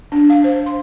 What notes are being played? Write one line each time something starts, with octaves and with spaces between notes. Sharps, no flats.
D4
F5
C5
C6